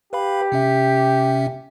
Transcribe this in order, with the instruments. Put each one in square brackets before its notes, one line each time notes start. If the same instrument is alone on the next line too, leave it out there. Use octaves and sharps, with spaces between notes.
[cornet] G4 [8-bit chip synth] B4 F5 B5
[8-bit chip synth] C3 C#4 E5